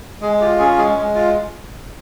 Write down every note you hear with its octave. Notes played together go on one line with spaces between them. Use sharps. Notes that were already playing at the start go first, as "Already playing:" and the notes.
G#3 G#4
F4 G4
C#4 G#4
G#3 G#4
G#3
F4